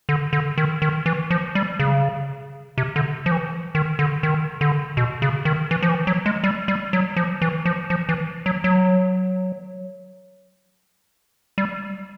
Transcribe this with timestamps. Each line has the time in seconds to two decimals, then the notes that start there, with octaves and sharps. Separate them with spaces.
0.09 D3
0.33 D3
0.58 D#3
0.82 D#3
1.06 E3
1.30 F3
1.55 G3
1.79 C#3
2.78 C3
2.96 D3
3.26 F3
3.32 E3
3.75 D#3
3.99 D3
4.23 D#3
4.61 D3
4.97 B2
5.22 C#3
5.45 D#3
5.71 E3
5.83 F3
5.89 E3
6.07 F#3
6.26 G#3
6.44 G3
6.68 G3
6.93 F#3
7.16 F3
7.42 E3
7.65 F3
7.90 F3
8.09 E3
8.46 F#3
8.64 F#3
11.58 G3